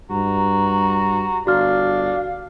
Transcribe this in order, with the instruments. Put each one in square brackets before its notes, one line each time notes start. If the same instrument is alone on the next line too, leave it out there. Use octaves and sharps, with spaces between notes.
[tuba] G2 [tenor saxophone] F#4 [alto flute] A#5
[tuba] G1 [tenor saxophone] D4 [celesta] F#4 F6 [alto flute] F5